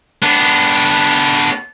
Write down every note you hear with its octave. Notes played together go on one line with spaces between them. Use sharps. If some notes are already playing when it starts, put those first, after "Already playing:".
B3 D4